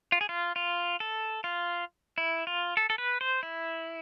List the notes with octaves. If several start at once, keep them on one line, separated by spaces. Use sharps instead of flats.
F4
G#4
F4
F4
A4
F4
E4
F4
A4
A4
B4
C5
E4